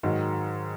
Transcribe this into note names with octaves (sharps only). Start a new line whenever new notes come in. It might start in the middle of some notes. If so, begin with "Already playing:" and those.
G#2 D#3 F#3